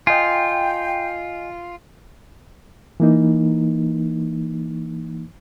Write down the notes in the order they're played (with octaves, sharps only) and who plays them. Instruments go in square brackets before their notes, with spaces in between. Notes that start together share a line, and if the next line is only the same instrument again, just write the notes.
[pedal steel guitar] F4 [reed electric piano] D#5 G#5 [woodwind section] G5
[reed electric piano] E3 A#3 D#4